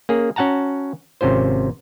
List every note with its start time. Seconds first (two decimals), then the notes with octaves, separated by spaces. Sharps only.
0.09 A#3 C#4 G#4
0.36 C#4 F#4 F#5 A5 A#5
1.21 G#1 C3 C#4 F4 C5